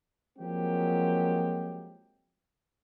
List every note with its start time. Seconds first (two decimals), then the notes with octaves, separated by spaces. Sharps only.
0.38 F3 F#3 G#3 A#3 C4 G4